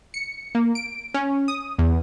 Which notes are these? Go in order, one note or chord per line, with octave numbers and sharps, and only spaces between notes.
C#7
A#3
D7
C#4
D#6
E2